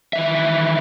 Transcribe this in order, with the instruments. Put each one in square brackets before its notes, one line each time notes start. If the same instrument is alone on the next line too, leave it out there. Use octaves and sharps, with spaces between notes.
[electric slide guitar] D#3 E3 E5